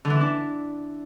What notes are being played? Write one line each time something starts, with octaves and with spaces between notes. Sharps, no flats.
D3
E3
E4
D4